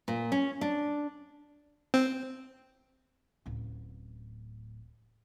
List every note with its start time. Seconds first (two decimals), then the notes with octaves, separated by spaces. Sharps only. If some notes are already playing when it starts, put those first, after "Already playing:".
0.08 A#2
0.32 C#4
0.61 D4
1.94 C4
3.46 D1 A1